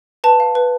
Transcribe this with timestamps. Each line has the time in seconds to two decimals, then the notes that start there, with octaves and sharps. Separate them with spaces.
0.24 B4 A5
0.40 F5
0.55 B4